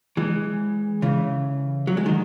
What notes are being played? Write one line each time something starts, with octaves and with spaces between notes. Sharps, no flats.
E3 G#3
C#3 E3
F#3
G#3
D#3 F#3